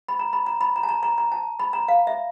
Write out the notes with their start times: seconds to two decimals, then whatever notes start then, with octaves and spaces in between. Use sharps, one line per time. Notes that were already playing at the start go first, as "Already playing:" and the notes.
0.08 B5
0.19 A#5
0.33 B5
0.46 A#5
0.61 B5
0.76 A#5
0.83 A5
0.89 A#5
1.03 A#5
1.18 A#5
1.32 A5
1.59 B5
1.73 A#5
1.88 F5
2.07 E5